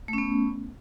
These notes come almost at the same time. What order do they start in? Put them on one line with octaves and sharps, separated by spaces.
A3 C#4 B3